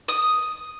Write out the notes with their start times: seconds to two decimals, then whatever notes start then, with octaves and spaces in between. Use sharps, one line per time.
0.08 D#6